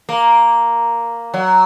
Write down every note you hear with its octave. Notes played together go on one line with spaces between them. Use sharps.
A#3
F#3